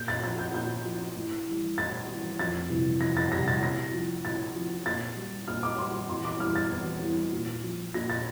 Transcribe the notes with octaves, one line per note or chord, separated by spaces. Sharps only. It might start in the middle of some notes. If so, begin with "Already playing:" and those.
Already playing: A#2 G6
A6
F3 A6
G6
A#2 G6
F3
A2
E3 G3
A2 A6
E3 G3
F2 A6
C3 E3 G3
F2 A#6
A6
C3 E3 G3 A#6
A6
A2 A#6
F3
A2 A6
F3
A#2 A6
G3
A#2 F6
D6
G3 C6
E2 C6
D6
E3 G3 F6
A6
E2
E3 G3
A#2
F3
A#2 A#6
A6